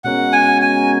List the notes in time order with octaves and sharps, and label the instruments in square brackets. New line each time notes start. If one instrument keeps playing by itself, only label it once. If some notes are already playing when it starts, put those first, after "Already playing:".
[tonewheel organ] B2 G#3 C#4 F#4 A#4 [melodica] F#5
[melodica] G#5
G#5